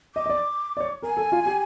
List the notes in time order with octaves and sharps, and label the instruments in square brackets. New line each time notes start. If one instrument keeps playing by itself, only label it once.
[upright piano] D#5 [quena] D6
[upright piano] D#5
D5
D5
C#5
[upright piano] A#4 [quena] G#5
[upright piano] A4
F4
G4